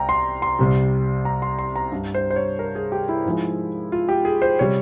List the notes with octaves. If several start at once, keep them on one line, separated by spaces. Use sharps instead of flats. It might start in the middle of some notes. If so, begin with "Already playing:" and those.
Already playing: C2 C3 G5 A#5
C6
C6
C2 C3 G3
A#5
C6
C6
A#5
G2 G3
C5
C5
C#5
A#4
G#4
G4
E4
G#2 F3 G#3
F4
G4
G#4
C5
C3 G3 C#5